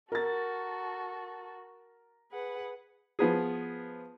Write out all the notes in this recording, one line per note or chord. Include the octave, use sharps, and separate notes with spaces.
F#4 A4 A#4 A6
G#4 B4 F#5
F3 B3 G#4